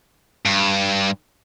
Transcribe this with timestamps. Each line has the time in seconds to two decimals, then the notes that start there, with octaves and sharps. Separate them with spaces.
0.45 G2